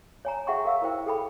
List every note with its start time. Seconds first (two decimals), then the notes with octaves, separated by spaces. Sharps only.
0.25 C#5 G#5 A#5
0.47 G#4 E5 F#5 G5 C6 C#6
0.65 A#4 F5 E6
0.82 E4 A#4 C5 G5
1.06 G#4 A4 G5 B5